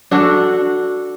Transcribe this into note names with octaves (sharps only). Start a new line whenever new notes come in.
D4 F#4 A4